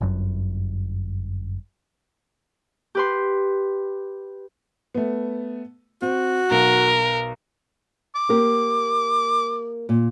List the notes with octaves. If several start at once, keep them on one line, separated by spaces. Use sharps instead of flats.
G1 F#2
G4 B4 C6
A3 B3
C4 F#4
B1 A#4
D6
A#3 G4 A#4
A#2